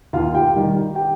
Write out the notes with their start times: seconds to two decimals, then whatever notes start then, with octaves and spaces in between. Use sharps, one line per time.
0.13 D#2 F4 F5
0.34 G4 G5
0.55 D#3 G3
0.95 G4 G5